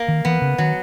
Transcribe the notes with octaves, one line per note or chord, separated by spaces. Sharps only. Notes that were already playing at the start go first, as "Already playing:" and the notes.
Already playing: A#3
D#3
E3 B3
C#3
D#3 F#3